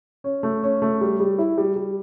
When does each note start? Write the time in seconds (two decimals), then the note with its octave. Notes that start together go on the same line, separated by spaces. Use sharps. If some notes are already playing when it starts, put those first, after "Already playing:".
0.24 C#4
0.43 A3
0.63 C#4
0.82 A3
1.01 G3
1.20 G3
1.38 E4
1.58 G3
1.76 G3